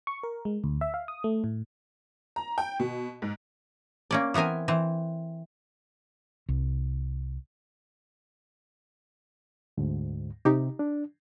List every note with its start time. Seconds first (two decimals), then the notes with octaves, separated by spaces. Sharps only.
0.07 C#6
0.23 A#4
0.45 G#3
0.64 D2
0.81 E5
0.94 F5
1.08 D#6
1.24 A3
1.44 A2
2.36 A#5
2.58 G5
2.80 B2
3.22 G#2
4.11 A#3 C#4 D5
4.34 E3 B3 C4 A#4 G#5
4.68 E3 C4
6.49 C2
9.78 D2 G#2
10.45 C3 D#4 G4
10.79 D4